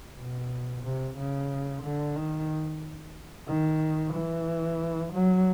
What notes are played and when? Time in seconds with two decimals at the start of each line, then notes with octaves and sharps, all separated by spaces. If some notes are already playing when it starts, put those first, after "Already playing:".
0.17 B2
0.83 C3
1.17 C#3
1.83 D3
2.16 D#3
3.47 D#3
4.14 E3
5.13 F#3